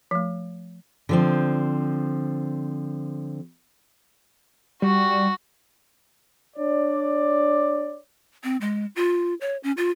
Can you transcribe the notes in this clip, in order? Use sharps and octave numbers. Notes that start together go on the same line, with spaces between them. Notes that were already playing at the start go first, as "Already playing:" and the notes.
F3 A3
D3 F3 C4
G3 F#4
D4 C#5 D5
C4
G#3
F4
C#5
C#4
F4